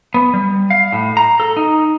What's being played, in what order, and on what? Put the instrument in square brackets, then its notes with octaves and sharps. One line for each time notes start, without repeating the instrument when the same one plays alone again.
[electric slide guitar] B3
G3
F5
A2
A#5
A4
D#4